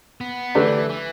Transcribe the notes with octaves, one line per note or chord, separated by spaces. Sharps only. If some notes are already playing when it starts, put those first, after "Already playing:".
B3
D3 E3 A3 D4 G4 B4
E3